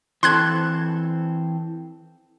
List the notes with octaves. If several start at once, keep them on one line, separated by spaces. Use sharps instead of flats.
E3 C4 A4 C6 F#6 G#6